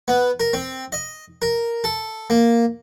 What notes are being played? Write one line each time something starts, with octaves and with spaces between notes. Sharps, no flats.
B3
A#4
C4
D#5
A#4
A4
A#3